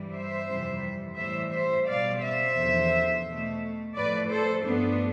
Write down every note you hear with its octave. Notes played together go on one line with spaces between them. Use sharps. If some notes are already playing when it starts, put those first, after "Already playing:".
Already playing: G2 E3 G3
C5 E5
F2 C3 E3 G3
A2 E3 G3 C5 E5
C5 E5
B2 G3 D5 F5
C5 E5
E2 D3 F3
B2 A3
A2 F3 A3 B4 D5
A4 C5
G2 F3 A3 B3 D4